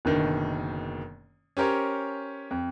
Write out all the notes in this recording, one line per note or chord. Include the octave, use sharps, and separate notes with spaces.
F#1 B2 D3 D#3
C#4 G4 A#4 C5 C#5
F2